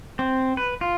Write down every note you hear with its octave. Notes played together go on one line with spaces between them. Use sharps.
C4
B4
F4